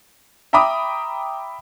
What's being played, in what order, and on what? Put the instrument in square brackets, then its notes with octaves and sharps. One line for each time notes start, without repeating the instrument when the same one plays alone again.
[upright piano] E5 G5 A#5 B5 D6 D#6